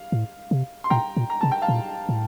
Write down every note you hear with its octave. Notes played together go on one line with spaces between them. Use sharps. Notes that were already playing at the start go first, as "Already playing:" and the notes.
Already playing: F5
A2
C3
C6
A#2 G5 A#5
A#2
A#5
C3 A5
G5
F5 A5
A#2
A2